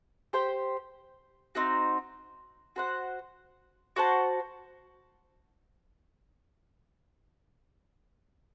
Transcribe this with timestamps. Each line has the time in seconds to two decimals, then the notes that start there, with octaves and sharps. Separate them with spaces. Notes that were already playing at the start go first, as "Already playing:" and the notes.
0.33 G4 C5 G5
1.55 C4 D#4 F#4
2.76 F#4 C5 F#5
3.96 F#4 C5 F#5 A5